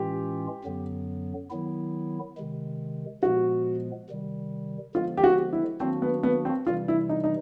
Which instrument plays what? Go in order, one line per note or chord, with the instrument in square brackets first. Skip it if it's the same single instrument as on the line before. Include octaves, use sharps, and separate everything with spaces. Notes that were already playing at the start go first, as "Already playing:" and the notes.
Already playing: [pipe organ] A2 E3 G#3 C#4 F4 [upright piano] G4
[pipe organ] F#2 D3 F#3 B3
D#3 F#3 B3 E4
C3 D#3 G#3
[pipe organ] A#2 F3 G#3 B3 [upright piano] F#4
[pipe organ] C3 D#3 G3
[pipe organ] D3 F3 G#3 B3 [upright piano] F4
[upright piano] G4
F#4
E4
[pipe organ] D#3 F#3 A#3 D4 F#4 [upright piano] C4
[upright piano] B3
B3
C4
[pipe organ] C3 E3 G3 [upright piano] F4
[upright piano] E4
D#4
D#4